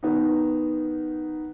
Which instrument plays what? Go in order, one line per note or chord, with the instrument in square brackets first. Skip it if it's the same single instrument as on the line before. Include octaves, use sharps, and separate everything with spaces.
[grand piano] D#3 B3 D#4